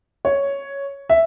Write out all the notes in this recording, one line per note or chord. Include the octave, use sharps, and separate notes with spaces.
C#5
E5